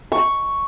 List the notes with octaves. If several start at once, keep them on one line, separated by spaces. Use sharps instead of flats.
C#6